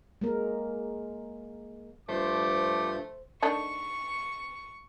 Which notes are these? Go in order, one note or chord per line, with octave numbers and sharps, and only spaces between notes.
G#3 A#3 A#4
G2 F3 A3 C5 D6 G6
D#3 A3 D4 C#6